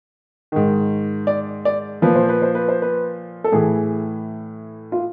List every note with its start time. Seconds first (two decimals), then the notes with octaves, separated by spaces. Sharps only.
0.52 G#2 D#3
1.27 D5
1.65 D5
2.02 A#2 F3 B4
2.15 C5
2.29 B4
2.42 C5
2.55 B4
2.68 C5
2.82 B4
3.44 A4
3.52 A2 E3 G#4
4.92 F4